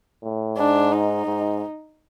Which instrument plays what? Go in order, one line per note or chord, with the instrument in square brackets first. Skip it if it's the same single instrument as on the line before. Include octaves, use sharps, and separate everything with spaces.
[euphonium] A2
[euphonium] G#2 [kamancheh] D4
[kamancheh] D#4
[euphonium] G#2